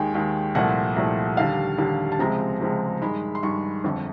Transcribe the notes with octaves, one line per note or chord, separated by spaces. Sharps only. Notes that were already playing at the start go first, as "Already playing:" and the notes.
Already playing: D#2 D#3 G#3 G5 G#5
D#2 D#3 G#3
C2 A#2 F3 A3 F#5
C2 A#2 F3 A3
D#2 D3 G3 F5
D#2 D3 G3
A5
C#2 C3 F3 G#3 C4 A#5
C#2 C3 F3 G#3 C4
G2 D#3 G#3 B5
C6
G2 D#3 G#3 C#6
G1 F2 D3